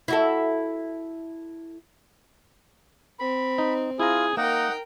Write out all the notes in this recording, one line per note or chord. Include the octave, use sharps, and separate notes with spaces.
E4 F#4 A4
C4 B5
D#4
E4 F4 G#4 A#5
A#3 D#4 A#4 F#5 G5